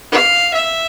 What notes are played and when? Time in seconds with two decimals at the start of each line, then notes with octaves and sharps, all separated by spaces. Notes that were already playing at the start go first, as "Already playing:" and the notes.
0.12 F5
0.54 E5